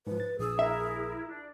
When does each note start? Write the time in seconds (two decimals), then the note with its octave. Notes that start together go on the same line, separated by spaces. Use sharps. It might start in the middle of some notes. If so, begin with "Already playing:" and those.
0.07 G#2 F3 B4
0.20 A6
0.39 A#1 G#4 D#6 E6
0.59 E4 A#4 E5
1.28 D4